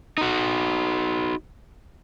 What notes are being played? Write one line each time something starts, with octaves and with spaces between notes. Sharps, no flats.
D#4 F#4